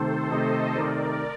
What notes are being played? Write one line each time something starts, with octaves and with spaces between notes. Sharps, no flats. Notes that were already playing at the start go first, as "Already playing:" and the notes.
Already playing: C3 D#3 A3 A4 C5
C3 D#3 A3 C5 D#5
C3 D#3 A3 A#4 D5